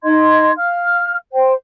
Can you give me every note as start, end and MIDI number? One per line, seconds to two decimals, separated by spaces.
0.04 0.52 63
0.04 0.52 75
0.04 0.52 84
0.04 0.52 92
0.57 1.16 77
0.57 1.16 89
1.33 1.52 72
1.33 1.52 79